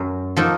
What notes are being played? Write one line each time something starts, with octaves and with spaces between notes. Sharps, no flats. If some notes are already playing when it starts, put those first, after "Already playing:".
Already playing: F#2
F3 A#3 D#4 A4